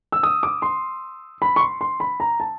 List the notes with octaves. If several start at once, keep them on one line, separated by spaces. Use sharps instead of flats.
E6
D#6
D6
C6
B5
C#6
C6
C6
B5
A#5
A5